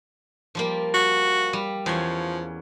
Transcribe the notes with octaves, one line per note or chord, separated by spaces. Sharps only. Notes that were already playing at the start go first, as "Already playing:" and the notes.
F3 G3 A#3
F#4
G3
E2 F3 C#4